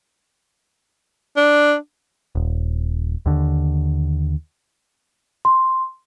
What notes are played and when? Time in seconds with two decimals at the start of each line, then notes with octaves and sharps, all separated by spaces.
1.36 D4
2.35 D#1
3.26 D#2 D3
5.45 C6